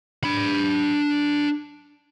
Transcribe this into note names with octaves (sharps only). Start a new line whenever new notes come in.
D4 B5